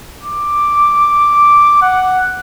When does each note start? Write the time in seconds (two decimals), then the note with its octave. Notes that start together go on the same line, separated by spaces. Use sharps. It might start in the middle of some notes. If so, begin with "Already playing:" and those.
0.23 D6
1.82 F#5